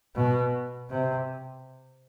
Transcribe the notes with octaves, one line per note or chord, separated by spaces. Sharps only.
B2
C3